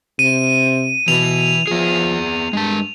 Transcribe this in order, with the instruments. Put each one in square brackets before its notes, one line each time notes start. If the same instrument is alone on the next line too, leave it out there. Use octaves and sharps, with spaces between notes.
[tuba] C3 [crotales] D#7
[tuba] B2 [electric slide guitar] E3 E4 [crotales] F7
[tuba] F3 [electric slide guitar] B3 G#4
[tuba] G2 [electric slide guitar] G#3 A5